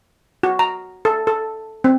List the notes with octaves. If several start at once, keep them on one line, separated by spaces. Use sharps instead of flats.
F#4
A#5
A4
A4
C4